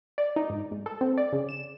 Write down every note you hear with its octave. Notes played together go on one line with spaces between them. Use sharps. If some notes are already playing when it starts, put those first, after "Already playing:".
D5
D#4
G#2
G#2
A4
C4
D5
C#3
E7